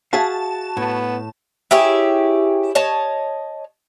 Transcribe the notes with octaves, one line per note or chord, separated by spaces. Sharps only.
F#4 G#4 E5 F5 A5
A2 B3
E4 G4 G#4 C#5
C#5 D#5 A5